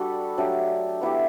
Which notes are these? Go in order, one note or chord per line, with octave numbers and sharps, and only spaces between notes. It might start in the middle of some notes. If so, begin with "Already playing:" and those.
Already playing: G3 D4 F#4 A4
F#3 A3 D4 G4
B3 E4 G4